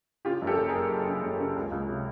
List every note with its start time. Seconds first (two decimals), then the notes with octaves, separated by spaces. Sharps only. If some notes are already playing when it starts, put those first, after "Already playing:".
0.25 C#3 F4 G4
0.42 F#2
0.47 G4 A4
0.58 F#1
0.68 G#4 A#4
0.74 F#1
0.90 F#1
1.07 C#3
1.23 F#2
1.39 C#3
1.56 C#2
1.72 C#2
1.88 C3